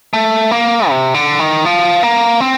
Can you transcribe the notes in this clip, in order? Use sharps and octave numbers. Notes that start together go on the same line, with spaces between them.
A3
A#3
C3
D3
D#3
F3
A#3
C4